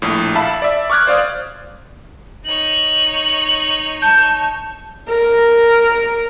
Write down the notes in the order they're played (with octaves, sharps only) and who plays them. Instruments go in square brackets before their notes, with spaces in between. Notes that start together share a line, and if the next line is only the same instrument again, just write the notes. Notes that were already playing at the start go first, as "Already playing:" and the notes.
[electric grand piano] A#1 A2
E5 F5 A5 B5
D5 E5
C#6 D6 F6 F#6 G#6
C5 D5 F5 D#6
[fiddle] D#4 C#5 [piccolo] F#7
[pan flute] A5 [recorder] G6
[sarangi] A#4